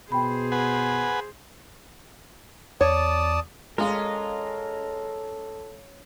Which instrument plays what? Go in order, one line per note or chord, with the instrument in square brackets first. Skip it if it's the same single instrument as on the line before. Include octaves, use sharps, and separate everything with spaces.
[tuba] B2 [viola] G#4 C5 [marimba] G5 B5
[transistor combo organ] B4 F#5 G#5
[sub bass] E2 [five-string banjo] C#5 [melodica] D5 A5 D#6
[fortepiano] G#3 F5 [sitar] C#4 F4 [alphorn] A4 [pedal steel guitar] A#4 D#5